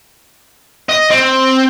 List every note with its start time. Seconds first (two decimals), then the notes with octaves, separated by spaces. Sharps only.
0.89 D#5
1.10 C4